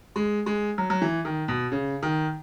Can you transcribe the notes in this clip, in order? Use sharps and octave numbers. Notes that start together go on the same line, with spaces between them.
G#3
G#3
F#3
F#3
E3
D#3
B2
C#3
D#3